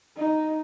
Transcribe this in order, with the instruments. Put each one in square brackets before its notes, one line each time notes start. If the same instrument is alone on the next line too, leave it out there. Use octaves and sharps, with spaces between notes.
[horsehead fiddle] D#4